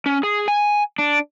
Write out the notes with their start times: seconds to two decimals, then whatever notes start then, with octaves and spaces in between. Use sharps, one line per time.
0.06 C#4
0.23 G#4
0.48 G#5
0.98 D4